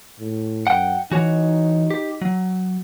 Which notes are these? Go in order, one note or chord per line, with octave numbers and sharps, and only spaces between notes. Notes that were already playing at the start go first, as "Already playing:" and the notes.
A2
F#2 F#5 G5
E3 D#4 F#4 C#5
G4
F#3